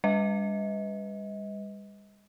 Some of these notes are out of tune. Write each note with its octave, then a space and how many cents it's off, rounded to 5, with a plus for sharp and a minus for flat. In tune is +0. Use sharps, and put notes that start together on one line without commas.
G3 +45 B4 +10 D#5 +35